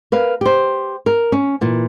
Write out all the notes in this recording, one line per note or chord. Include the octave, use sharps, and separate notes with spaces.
A#4 B4 F5
G4 C5
A#4
C#4
A#2 E3